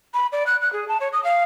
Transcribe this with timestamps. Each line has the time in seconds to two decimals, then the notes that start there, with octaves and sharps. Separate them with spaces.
0.14 B5
0.32 D5
0.46 F#6
0.61 F#6
0.72 G#4
0.88 A5
1.00 C#5
1.12 D#6
1.24 F5